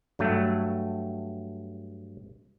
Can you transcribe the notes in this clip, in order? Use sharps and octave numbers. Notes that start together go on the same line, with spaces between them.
G2 F#3 A3